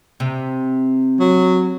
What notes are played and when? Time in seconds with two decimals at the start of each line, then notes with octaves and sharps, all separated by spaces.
0.20 C3
1.20 F#3